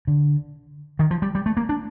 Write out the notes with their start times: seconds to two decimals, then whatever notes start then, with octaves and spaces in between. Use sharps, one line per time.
0.07 D3
0.99 D#3
1.11 F3
1.22 G3
1.35 G3
1.46 A3
1.57 A#3
1.69 D4